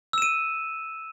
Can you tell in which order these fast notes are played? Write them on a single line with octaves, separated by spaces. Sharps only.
E6 E7 D#7